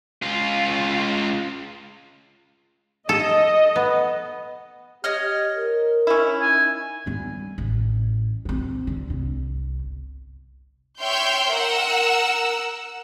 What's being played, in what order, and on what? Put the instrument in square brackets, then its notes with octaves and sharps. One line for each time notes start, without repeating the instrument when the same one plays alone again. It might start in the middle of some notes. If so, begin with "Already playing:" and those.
[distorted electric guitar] C#2 F4
[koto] A4 [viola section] D#5
[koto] B3
[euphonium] G4 [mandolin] C#5 D#5 F6
[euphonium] A#4
[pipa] C#4 E4
[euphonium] D#4 [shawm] G#5
[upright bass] G3 B3
A1
B3 C4
D3
G1 C2
[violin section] C#5 E5 G5 C6 F6 G6
A#4 F#5 E6